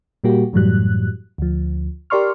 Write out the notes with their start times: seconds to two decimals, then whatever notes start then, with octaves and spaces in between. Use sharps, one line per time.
0.24 A#2 G3 A#3 F#4 G4
0.53 F#2 A2 E3 F#3 G3 F#6
1.38 D2 F3
2.10 G4 A#4 D5 C6 C#6 F6